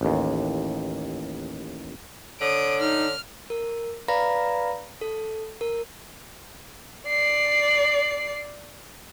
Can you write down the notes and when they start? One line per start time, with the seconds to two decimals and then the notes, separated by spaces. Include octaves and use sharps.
0.01 A1 D#2
2.41 D3 C#5 D#6 D7
2.80 D#4 F6
3.50 A#4
4.08 B4 D5 F5 A#5 B5 A#6
5.01 A4
5.61 A#4
7.08 D5 C7